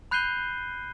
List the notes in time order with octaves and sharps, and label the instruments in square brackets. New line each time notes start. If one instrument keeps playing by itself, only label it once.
[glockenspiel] B5 F#6 G6 C7 D#7 G7